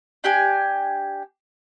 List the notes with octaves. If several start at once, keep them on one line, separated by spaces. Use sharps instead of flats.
D4 G4 G5 G#5